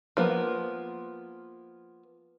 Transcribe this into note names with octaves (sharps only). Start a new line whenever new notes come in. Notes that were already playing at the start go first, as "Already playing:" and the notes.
F3 A#3 B3